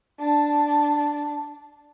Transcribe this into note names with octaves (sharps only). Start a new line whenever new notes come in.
D4 A5